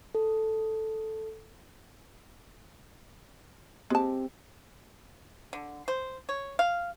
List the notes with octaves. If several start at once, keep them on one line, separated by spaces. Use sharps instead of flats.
A4
G#3 C4 G4 A5
D3
C5
C#5
F5